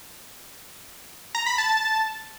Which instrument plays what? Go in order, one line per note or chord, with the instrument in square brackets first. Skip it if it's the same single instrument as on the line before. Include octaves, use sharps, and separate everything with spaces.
[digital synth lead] A#5
B5
A5